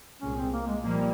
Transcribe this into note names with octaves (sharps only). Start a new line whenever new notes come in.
C2 A#2 G#3 C#4
C4
A#3
G#3
A#2 F3 G3 A#3